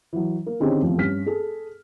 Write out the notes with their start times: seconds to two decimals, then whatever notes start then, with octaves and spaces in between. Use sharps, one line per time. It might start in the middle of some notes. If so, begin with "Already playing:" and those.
0.13 E3 F#3
0.46 A#3
0.60 D3 D#3 C4 C#4 G4 G#4
0.81 F1 E2 F3 C4
0.98 G2 C#4 F6 B6
1.26 G#4 A4